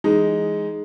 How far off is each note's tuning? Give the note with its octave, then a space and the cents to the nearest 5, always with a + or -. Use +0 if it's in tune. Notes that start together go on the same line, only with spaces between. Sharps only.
E3 +20 G#3 +0 D#4 +0